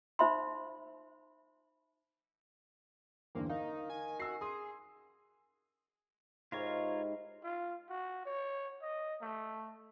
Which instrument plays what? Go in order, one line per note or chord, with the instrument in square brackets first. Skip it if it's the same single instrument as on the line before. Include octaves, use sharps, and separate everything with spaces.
[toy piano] D#4 C5 E5 B5 C6
[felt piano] E2 G2 D3 [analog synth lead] A#3 [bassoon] C4
[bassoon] D#3 [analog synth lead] D#4 [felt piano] F5
[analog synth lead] G#5
[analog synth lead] F#4 [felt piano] G#5 E6 C7
[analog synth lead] G#4 [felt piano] C6 D#6
[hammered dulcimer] G#2 E4 G4 [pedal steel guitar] F4 A#4 C#5
[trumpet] F4
F#4
C#5
D#5
A3